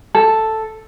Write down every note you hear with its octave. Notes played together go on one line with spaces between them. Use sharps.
A4